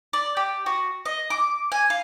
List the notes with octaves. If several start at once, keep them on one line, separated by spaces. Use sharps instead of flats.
D5
G4
F#4
D#5
D6
G#5
F5